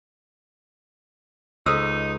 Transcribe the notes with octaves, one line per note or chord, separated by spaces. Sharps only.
C#2 D#4 A4 C5 E6